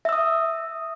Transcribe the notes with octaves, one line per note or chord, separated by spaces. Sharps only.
E5 D#6 E6